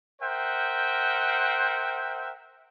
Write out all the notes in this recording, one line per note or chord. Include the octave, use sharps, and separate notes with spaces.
A#4 C5 E5 F#5 G5